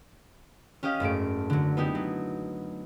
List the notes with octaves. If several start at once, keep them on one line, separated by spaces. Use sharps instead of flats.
C#4 G4 D#5 F5
F#1 G#2 A3 D7
D3 F#3
B3 D#4 E4 G4
F#3